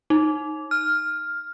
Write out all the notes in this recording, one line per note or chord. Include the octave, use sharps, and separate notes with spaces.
D#4
F6